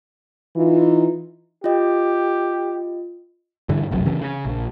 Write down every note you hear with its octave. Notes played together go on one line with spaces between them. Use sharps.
E3 D#4 F4
F4 G4 D#5
G2 D3 E3
F1 B1 F#2
C#3 E3 C#4
C#3
A#1